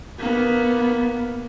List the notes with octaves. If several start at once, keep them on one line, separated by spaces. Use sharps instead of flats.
A#3 B3